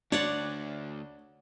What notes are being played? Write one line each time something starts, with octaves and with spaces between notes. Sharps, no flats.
D2 D4 C#5 D5 F#5